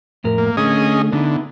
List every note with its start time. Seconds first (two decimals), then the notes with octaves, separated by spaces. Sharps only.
0.24 F2 A2 A#4
0.38 A#3
0.57 D3 A3 C#4 G#4 D#5
1.13 D3 B3 D#4 E4